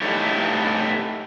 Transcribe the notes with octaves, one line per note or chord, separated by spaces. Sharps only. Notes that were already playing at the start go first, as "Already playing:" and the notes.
A2 A3 D#4 E4 G4 C#5